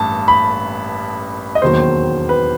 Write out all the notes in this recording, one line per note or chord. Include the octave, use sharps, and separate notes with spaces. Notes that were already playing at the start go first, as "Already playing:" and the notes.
Already playing: A1 G2 A5
B5
D#5
E1 D#2 D#3 F#3 C5
B4